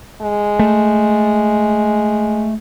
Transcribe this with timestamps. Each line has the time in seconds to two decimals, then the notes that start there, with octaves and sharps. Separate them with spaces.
0.21 G#3
0.59 A3